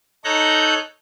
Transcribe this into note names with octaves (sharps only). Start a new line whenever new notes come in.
D#4 A4 C#5 A#5 F#6 G6